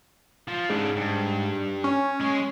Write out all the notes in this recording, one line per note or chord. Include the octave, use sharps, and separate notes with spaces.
F3
G#2 C#3 D4
G2
C#4
G#3 G#4